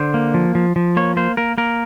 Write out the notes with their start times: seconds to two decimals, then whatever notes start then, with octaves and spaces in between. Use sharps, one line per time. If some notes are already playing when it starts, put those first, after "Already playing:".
Already playing: D3 C5
0.14 A#3
0.34 F3
0.55 F3
0.76 F3
0.97 A#3 C#5
1.17 A#3 C5
1.37 A#3 A#4
1.58 A#3 A#4